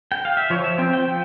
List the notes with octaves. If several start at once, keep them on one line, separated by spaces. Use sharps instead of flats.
G5
F5
E5
F3 C#5
E5
C4 G5
G5
F3 G5